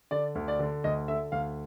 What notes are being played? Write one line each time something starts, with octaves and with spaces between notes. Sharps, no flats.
D3 D5
D2
D5
D3
D2 D#5
D3 E5
D2 F5